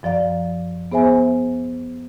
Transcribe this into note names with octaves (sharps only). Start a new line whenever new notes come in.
F#2 F3 D5 F5
B3 G#4 C5 E5 G#5